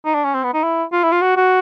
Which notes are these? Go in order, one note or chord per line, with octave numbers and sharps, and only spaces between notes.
D#4
D4
C#4
C4
B3
D#4
E4
F4
E4
F4
F#4
F#4